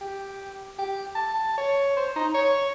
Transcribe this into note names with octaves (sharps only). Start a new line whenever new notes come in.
G4
G4
A5
C#5
C5
D#4
C#5